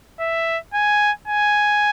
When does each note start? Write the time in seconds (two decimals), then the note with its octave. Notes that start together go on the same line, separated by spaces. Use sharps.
0.20 E5
0.74 G#5
1.28 G#5